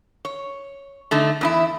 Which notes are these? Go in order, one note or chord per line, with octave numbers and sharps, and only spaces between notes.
C#5
D3 A3 D#4
E2 D#4 E4